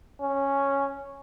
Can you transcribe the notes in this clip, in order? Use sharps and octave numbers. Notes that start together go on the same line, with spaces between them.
C#4